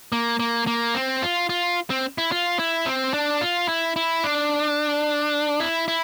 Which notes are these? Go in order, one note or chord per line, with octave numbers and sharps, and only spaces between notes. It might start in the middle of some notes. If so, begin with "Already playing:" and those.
A#3
A#3
A#3
C4
F4
F4
C4
E4
F4
E4
C4
D4
F4
E4
E4
D4
E4
E4